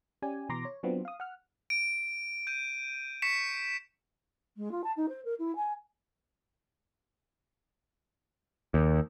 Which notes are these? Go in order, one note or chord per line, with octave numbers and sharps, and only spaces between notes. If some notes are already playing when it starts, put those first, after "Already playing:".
C#4 G4 D5 G#5
B2 E3 A#5 C6 D6 A#6
C#5
F#3 B3 C4 D4 F4
F5 D#6
F#5 F6
D7
G6 D#7
C#6 B6 C#7 E7
G#3
F4
A5
D#4
C5
A#4
E4
G#5
D#2